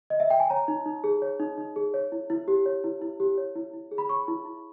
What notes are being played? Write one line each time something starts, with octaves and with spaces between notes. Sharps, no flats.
D#5
E5
G5
G#5
C#5 A#5
D#4
D#4
G#4
C#5
D#4
D#4
G#4
C#5
E4
E4
G4
C#5
E4
E4
G4
C#5
E4
E4
G#4
B5
C#5 C#6
E4
E4